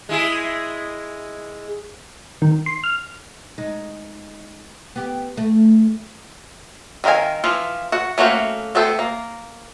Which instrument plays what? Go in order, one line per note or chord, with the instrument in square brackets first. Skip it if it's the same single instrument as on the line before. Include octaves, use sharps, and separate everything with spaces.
[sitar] G#3 E4 G#4
[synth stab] D#3
C6
F6
[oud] G#3 D#4
B3 G4
A3
[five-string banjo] D#3 C4 A#4 F5 G#5
E3 F3 E4 F4
F#4 F#5
A3 A#3 C#4 F#4 C5
A3 B3 C4 A4 C5
A#3